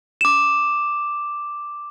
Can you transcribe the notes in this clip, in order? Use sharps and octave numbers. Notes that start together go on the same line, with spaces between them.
D6 E7